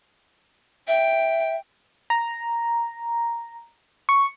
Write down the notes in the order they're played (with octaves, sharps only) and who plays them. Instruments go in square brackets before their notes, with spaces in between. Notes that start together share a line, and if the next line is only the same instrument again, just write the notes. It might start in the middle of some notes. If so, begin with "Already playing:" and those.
[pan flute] E5 [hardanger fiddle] G5
[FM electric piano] A#5
C#6